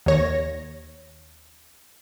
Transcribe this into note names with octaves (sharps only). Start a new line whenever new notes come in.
D#2 C#5 A#6